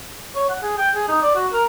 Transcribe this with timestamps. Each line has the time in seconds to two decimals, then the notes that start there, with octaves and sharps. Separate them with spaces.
0.36 C#5
0.50 F#5
0.63 G#4
0.78 G5
0.95 G#4
1.08 D#4
1.22 D5
1.35 F#4
1.53 A#4